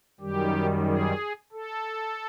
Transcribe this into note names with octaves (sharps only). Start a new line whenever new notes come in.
F#2 D#3 G3 G4
G#4
A4